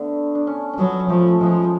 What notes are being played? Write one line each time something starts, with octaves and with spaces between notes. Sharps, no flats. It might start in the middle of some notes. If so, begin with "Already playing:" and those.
Already playing: D3 A3 B3
D4
C#4
C#4
F#3 B3
F3 A3
F3 G#3